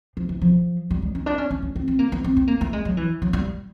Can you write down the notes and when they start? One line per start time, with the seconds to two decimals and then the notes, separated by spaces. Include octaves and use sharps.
0.17 F3
0.29 E3
0.41 F3
0.90 G3
1.02 G#3
1.15 C#4
1.26 D4
1.38 C#4
1.51 C#4
1.62 C#4
1.76 C4
1.88 C4
1.99 A#3
2.12 B3
2.24 C4
2.37 C4
2.48 A#3
2.61 A3
2.73 G#3
2.85 F#3
2.97 E3
3.22 F#3
3.33 G3